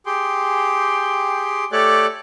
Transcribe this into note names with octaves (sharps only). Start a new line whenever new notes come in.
G4 G#4 G5 C6
A3 G4 A4 C#5 D5 F#6